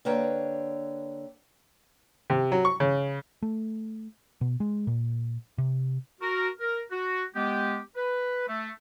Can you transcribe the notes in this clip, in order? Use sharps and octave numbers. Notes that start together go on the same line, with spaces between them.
D3 A#3 B4 C#5 G5
C3
F#3
C#6
C#3
A3
B2
G#3
A#2
C3
F#4 A#4
A#4
F#4
G#3 B3 G4
B4
A3